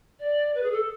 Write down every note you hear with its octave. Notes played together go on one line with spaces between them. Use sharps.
D5
B4
G#4
A4